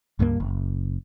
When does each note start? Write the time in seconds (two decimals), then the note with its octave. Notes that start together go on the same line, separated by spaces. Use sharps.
0.19 C#2 G2 F3 A#3
0.40 F#1